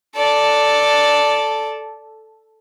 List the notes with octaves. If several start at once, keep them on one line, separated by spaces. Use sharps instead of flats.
A4 D5